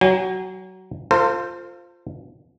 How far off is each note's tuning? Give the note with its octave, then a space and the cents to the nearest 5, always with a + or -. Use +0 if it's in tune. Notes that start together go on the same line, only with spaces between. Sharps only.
F#3 +20 G#5 -40
F4 +0 A4 +45 C5 -5